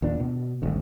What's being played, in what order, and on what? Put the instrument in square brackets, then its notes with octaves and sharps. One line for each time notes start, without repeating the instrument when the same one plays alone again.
[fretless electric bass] D#2 A#2 D4
B2
D#1 G#1 D2